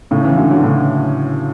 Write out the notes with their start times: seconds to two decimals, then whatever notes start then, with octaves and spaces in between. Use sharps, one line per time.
0.11 A2 C#3
0.24 C#3 E3
0.37 D3 F#3
0.51 D3 F#3
0.63 A2 C#3